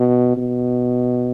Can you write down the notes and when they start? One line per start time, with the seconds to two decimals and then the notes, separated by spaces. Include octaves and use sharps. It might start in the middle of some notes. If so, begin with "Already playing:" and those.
Already playing: B2
0.37 B2